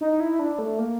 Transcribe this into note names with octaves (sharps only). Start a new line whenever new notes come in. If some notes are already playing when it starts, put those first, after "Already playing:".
D#4
E4
D4
A3
A#3